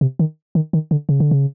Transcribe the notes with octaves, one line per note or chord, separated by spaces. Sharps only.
C3
D#3
D#3
D#3
D3
C#3
D3
C#3